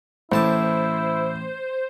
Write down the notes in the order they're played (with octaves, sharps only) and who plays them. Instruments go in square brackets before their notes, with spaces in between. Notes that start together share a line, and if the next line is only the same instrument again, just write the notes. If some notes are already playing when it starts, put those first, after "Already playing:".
[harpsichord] A1 A5 D6 [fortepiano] A2 [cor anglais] E4 [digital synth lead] C5